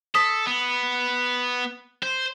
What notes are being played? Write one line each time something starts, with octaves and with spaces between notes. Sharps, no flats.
A4 D#6 B6
B3
C5